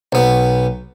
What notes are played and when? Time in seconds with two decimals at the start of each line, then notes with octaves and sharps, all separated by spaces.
0.12 B1 B3